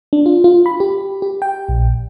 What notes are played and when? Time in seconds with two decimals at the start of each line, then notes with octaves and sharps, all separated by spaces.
0.13 D4
0.26 F4
0.44 F4
0.66 B5
0.80 G4
1.22 G4
1.42 G5
1.69 A#1